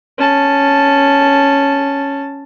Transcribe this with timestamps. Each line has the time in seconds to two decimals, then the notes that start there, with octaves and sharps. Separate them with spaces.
0.18 C#4 A5